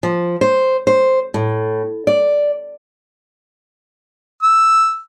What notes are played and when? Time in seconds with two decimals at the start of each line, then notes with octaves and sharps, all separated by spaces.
0.03 F3
0.41 C5
0.87 C5
1.34 A2
2.07 D5
4.43 E6